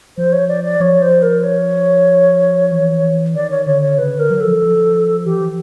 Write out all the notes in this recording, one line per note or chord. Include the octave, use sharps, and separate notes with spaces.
F3 C5
C#5
D5
D5
F3 C#5
C5
A#4
C#5
E3
D#3 D5
C#5
D3 C#5
C#5
C#3 B4
D3
A#4
F#3
A4
F3
F3
E3 G4
F3
E3